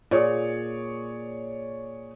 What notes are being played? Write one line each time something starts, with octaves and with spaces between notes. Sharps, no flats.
A#2 G#4 C#5 D5